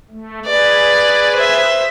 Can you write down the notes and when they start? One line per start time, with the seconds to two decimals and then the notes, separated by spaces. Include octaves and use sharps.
0.10 A3
0.46 G#4 B4 D5
1.36 C5 E5